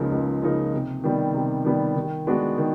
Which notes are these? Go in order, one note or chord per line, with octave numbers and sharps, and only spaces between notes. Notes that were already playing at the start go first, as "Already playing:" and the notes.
Already playing: C#2 C#3 F3 A#3 D#4
C#2
C#3 F3 A#3 D#4
C3
D#3 G3 B3
C3
D#3 G3 B3
D#3
G#3 B3 D4 F#4
D#3